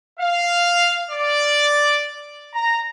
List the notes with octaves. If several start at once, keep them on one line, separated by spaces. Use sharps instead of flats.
F5
D5
A#5